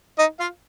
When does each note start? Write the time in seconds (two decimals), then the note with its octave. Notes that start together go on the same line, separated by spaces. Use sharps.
0.18 D#4 D#5
0.40 F4 F5